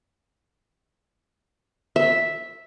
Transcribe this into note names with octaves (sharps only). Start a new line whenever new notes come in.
E5